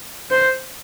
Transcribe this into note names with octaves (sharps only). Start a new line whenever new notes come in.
C5